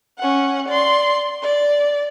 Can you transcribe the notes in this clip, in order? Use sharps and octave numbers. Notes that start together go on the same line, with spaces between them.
C#4 F#5
D5 C6
D5